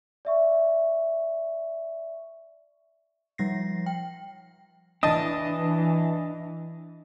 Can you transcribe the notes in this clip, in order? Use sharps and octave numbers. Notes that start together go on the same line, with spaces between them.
D5 E5 C#6
F3 G3 A#6 C7
G5
E3 D4 D#5 A5